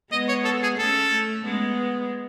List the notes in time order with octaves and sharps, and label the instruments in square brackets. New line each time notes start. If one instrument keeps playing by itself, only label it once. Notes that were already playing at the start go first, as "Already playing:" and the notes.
[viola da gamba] G#3 B3 [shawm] D#5
[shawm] C#5
A4
G#4
[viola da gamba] A3 C#4 [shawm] A4
[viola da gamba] G#3 B3